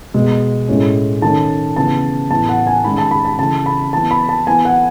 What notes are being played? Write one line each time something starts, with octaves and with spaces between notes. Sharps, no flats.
B2 G#3 B3
A2 G#3 C#4
D#3 A3 C#4 A5
C#3 E3 B3 A5
A2 E3 B3 A5
F#5
G#5
D#3 G#3 C#4 B5
A5
B5
A5
C#3 E3 A3 A5
B5
E3 B3 A5
B5
A5
E3 B3 G#5
F#5